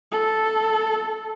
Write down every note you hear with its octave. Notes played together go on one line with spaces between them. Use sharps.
A4